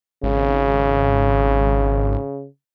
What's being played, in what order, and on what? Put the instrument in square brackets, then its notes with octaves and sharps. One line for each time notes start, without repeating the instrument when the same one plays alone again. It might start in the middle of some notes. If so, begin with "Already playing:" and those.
[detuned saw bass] G#1 [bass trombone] C#3